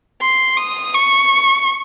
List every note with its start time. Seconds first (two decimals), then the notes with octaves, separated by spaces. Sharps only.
0.21 C6
0.57 D#6
0.94 C#6